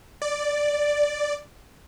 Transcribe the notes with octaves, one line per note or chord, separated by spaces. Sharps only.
D5